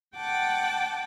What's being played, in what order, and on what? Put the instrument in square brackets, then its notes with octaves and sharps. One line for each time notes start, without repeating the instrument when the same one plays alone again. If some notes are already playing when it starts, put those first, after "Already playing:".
[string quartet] F#5 G5 A5 D6